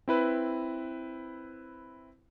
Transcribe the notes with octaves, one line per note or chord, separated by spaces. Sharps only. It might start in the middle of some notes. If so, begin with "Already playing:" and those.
C4 E4 B4